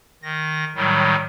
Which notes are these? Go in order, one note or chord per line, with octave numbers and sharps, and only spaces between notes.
D#3 A#6
A2 D#3 F#3 G3